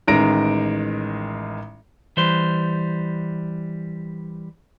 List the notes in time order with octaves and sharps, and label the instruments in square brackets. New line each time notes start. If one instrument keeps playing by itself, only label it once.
[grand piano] A1 D#3 G#3 A#5 A#6 D7
[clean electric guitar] E3 G3 C5